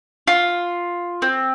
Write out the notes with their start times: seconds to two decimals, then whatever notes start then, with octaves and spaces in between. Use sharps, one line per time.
0.27 F4
1.22 C4